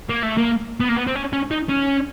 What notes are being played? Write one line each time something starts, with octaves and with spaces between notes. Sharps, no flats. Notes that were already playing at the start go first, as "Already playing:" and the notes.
A#3
A3
A#3
B3
A#3
B3
C4
C#4
C#4
D#4
C#4